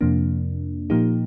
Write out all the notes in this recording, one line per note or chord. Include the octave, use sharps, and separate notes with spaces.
F2 C3 F3 A#3 D4
A#2 F3 A#3 D#4 G4